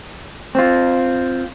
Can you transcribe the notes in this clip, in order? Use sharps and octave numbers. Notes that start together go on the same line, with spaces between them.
C4 F4